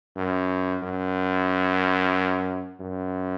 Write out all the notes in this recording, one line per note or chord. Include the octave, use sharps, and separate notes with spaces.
F#2
F#2
F#2